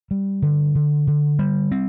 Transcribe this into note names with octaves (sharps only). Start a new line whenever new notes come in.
G3
D3
D3
D3
G3
C4